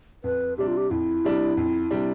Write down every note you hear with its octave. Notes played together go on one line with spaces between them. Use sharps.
F2 B4
C3 G3 D4 G4
F4
G4
F2 E4
C3 G3 D4
F2
C3 G3 D4